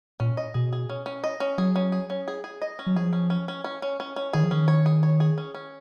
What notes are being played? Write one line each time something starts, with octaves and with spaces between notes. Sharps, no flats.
A#2 C#4
D#5
B2 G#4
G#4
C#4
C#4
D#5
C#4
F#3 G#4
C#4
G#4
C#4
G#4
G#4
D#5
C#4
F#3
F3 G#4
C#4
C#4
C#4
C#4
C#4
C#4
C#4
D#3 G#4
F3
D#3 C#4
C#5
G#4
C#5
G#4
C#4
C#4